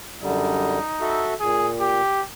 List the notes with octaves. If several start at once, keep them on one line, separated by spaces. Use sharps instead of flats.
F#2 D3 G3 D#4
F#4 A4 E5
A#2 G#4
G4